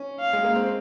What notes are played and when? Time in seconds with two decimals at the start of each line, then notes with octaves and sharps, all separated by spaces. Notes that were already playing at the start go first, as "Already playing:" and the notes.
Already playing: C#4
0.20 F5
0.33 G#3
0.44 A#3
0.55 C4